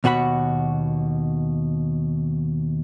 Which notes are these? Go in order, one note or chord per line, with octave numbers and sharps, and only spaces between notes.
D#2 B2 F#4 F#5 B5